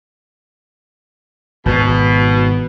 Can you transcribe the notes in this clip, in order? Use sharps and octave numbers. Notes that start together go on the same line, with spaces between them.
G#1 B2